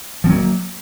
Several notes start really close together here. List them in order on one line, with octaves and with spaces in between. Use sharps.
F3 C4 F#3 A#3